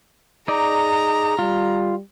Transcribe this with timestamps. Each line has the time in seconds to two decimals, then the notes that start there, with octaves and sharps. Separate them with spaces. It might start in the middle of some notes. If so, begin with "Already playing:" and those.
0.48 D#4 G#4 D5 A#5
1.39 G3 F4